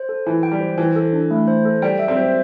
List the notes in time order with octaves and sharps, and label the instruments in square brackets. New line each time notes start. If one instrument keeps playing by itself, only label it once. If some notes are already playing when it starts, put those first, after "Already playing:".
Already playing: [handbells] C5
A4
[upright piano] E3 [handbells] E4
[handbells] G5
[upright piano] G3
[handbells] C5
[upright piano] E3 [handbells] C5
[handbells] A4
D4
A3
C5
A4
[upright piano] G3 [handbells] G5
[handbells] E5
[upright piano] G3 C4
[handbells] C5